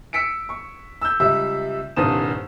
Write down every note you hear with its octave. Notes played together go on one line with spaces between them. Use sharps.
E6 B6 C#7 D7
C#6
E6 G6
C#2 G3 E5 E6
D#1 C2 G2 C5 D#6 E7